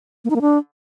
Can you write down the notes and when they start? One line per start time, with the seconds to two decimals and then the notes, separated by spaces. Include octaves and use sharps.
0.25 A#3
0.30 D#4
0.36 A#3
0.41 D4